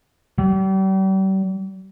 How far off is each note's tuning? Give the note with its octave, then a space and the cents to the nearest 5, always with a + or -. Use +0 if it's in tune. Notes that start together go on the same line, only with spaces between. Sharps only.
G3 -40